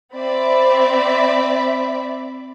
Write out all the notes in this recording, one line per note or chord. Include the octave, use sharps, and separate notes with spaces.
C4 D5 E5 B5